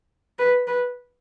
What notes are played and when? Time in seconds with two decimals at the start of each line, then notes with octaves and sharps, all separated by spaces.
0.39 B4
0.67 B4